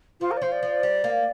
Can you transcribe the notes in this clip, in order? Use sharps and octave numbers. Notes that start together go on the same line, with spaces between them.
F3 F4
A#4
D5
F3 C5
D5
F3
G3
A#3